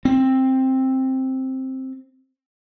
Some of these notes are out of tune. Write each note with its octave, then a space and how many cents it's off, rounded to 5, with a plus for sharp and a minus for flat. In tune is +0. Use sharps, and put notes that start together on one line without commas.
C4 +5